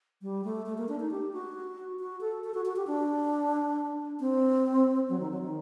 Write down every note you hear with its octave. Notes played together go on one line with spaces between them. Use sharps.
G3
A3
A3
A#3
D4
D#4
G4
F#4
F#4
A4
A4
F#4
F#4
G4
D4
C4
F#3
D#3
F#3
D#3